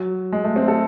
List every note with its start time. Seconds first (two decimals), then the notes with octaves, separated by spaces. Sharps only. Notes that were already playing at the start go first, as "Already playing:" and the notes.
Already playing: F#3
0.32 G#3
0.44 A3
0.56 C4
0.68 A4